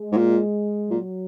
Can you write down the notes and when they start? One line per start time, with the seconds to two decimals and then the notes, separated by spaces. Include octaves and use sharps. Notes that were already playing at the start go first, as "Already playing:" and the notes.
Already playing: G#3
0.12 G#2
0.17 A#2
0.90 A#2 F#3